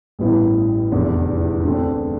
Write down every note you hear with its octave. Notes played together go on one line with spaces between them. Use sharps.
A1 G2 E3 B3 E4
F1 E2 D3
D2 D3 A3 C4